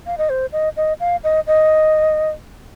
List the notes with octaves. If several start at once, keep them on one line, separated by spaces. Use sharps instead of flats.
F5
D#5
C5
D#5
D#5
F5
D#5
D#5